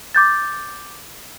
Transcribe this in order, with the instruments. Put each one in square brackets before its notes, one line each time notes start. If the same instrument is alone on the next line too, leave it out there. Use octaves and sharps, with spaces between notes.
[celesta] D6 G6 A6